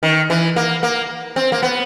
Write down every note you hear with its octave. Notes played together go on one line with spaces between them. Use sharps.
D#3
E3
A#3
A#3
C4
A#3
B3